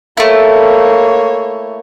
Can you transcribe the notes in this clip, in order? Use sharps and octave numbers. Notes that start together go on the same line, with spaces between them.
A3 A#3 E4 C#5